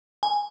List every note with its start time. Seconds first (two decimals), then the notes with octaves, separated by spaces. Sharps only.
0.23 G#5